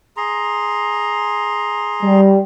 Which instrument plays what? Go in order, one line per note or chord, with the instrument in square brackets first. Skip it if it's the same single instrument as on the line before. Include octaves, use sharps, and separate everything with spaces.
[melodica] G#4 A#5 C6
[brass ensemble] G3